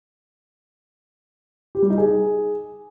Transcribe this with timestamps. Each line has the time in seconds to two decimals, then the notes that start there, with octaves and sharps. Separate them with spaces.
1.75 G4
1.82 G3
1.90 D#4
1.98 G#4